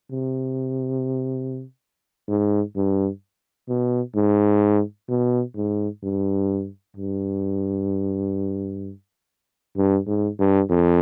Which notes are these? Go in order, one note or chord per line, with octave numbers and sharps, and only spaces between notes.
C3
G#2
G2
B2
G#2
B2
G#2
G2
G2
G2
G#2
G2
F2